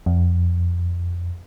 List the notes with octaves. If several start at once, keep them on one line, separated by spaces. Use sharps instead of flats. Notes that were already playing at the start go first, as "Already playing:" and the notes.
F2